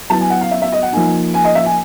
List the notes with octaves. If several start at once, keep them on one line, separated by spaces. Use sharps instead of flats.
F#3 B3 E4 A5
G#5
F#5
F5
E5
E5
D#5
F#5
F3 A#3 D#4 G#5
G#5
D#5
E5
G#5